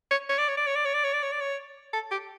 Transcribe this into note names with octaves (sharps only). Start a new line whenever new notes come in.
C#5
C#5
D5
C#5
D5
C#5
D5
C#5
D5
C#5
D5
C#5
D5
C#5
A4
G4